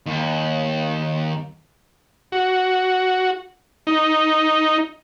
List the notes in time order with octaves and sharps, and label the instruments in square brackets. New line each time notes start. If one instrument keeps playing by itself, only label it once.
[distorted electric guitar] D#2
[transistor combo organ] F#4
D#4